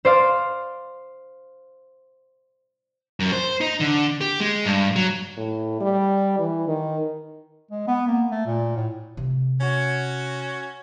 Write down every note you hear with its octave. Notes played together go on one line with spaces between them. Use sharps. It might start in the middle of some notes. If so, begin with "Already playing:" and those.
C5 D5 F5
F#2
C5
D#4
D3
G4
G#3
G2
F#3
A2
G3
E3
D#3
G#3
B3
A#3
A3
A#2
A2
C3 A3
C#4 F#4